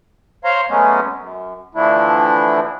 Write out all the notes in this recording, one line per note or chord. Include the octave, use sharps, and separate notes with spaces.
C5 C#5 F5 A#5 C6
F#3 G#3 A3 B3 C#4
F#2
D3 E3 F3 A3 D4 E4